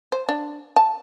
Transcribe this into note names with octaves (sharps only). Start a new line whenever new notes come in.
C5
D4
A5